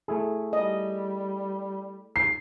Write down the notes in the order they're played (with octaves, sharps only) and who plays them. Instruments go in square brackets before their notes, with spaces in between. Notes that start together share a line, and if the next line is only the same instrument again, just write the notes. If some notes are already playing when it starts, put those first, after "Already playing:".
[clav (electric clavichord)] A3 E4 G#4
[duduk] G3 [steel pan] D#5
[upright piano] C7